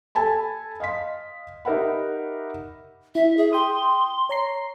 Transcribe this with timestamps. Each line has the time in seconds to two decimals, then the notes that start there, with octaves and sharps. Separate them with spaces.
0.15 A4 G#5 A5 B5
0.80 D#5 F5 C6 B6
1.65 D#4 G4 A#4 E5 F#5 B5
3.15 E4 E5
3.37 G#4
3.53 G5 C6 D#6
4.29 C#5 A#5 C7